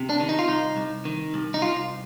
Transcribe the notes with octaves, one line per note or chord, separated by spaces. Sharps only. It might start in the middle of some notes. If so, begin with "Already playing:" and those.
Already playing: C3
D4
D#3
D#4
F4
C2 D#4
C2
D#3
C2
D#4
C2 F4